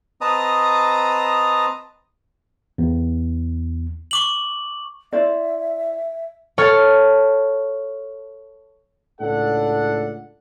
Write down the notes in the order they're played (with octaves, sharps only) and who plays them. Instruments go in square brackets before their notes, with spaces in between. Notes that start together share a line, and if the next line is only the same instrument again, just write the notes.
[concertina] C4 B4 D#5 A5 A#5 D#6
[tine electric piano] E2
[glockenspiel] C#6 D6 F#7
[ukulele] E4 C5 D5 [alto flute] E5
[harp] A4 C#5 A5 F6
[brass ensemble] C#2 A2 D4 A4 F#5